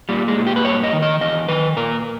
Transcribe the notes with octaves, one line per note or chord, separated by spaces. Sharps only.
A#2 G3
G#3
A#2
G4
B4
G2 C#5
D#5
D#3
D#5
E2 D#5
D#3 B4
A#2 A#4